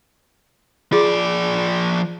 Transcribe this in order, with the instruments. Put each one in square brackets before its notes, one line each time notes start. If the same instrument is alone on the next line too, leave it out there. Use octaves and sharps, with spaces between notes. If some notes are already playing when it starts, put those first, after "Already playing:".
[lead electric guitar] F3 D5 [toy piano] F4 G#4 C6